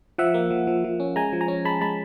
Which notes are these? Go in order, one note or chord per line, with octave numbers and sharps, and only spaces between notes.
F3 E5 F#5
A#3
F3
F3
F3
C#4
G#3 G#5 A#5
F3
G#5 A#5
C#4
G#3 A5 B5
G#3 A5 B5